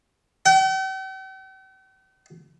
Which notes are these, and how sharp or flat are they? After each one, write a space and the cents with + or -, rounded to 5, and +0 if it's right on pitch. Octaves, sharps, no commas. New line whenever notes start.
G5 -45